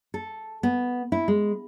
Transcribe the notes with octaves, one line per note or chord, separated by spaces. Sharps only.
A4
B3
E4
G#3